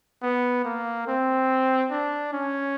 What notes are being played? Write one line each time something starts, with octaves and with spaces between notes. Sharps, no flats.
B3
A#3
C4
D4
C#4